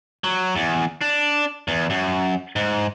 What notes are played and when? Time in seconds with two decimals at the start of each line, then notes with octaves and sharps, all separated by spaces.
0.24 F#3
0.56 E2
1.01 D4
1.68 E2
1.90 F#2
2.56 G#2